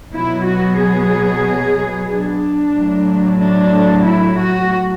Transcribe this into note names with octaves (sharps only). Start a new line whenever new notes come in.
B2 F#3 B3 E4
F#4
G#4
D4
A2 F#3 A3
D4
E4
F#4